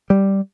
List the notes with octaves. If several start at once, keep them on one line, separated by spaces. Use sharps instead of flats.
G3